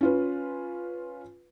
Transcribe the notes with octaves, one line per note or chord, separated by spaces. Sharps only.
C#4 F4 B4